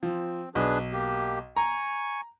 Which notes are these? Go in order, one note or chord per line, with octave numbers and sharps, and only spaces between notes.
F3 C4
B1 D4 G#4 B4
A#3 G4
G#5 A#5 C#6